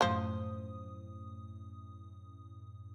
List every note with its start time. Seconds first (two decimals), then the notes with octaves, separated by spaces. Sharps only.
0.01 F#2 A2 F3 C5 D#6